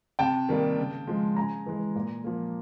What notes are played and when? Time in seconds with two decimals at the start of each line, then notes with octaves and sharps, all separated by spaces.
0.19 C3 G5 A5
0.49 D#3 G3 A#3
0.78 C#3
1.07 F3 G#3
1.36 C#3 G#5 A#5
1.66 E3 G#3
1.95 A#2
2.24 F3 A#3